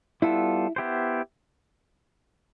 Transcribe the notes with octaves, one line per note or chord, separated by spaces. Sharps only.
G3 B3 E4 F4 A4
B3 E4 G4 C5